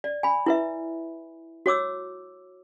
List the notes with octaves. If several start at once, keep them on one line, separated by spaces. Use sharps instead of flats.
D5
G#5 B5
E4 B4 E5
F#4 C#5 D6 E6